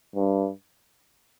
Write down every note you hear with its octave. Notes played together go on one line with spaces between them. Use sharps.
G2